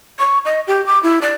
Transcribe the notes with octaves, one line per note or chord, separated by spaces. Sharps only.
C#6
D#5
G4
D6
E4
D5